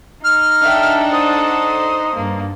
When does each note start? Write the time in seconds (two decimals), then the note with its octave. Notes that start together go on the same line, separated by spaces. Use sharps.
0.24 D#4 F6
0.62 D4 A4 E5 F#5 G5
1.12 C5 D#6
2.15 G2 A#3